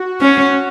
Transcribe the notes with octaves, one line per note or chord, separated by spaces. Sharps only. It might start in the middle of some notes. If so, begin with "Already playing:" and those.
Already playing: F#4
C#4